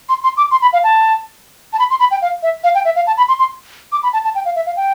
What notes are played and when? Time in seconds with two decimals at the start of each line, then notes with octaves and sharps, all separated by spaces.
0.09 C6
0.24 C6
0.37 D6
0.51 C6
0.62 B5
0.73 F5
0.84 A5
1.73 A5
1.79 B5
1.90 C6
2.00 B5
2.11 G5
2.22 F5
2.43 E5
2.64 F5
2.75 G5
2.85 E5
2.96 F5
3.07 A5
3.17 B5
3.28 C6
3.39 C6
3.92 D6
4.03 B5
4.13 A5
4.24 A5
4.35 G5
4.45 F5
4.56 E5
4.66 F5
4.77 G5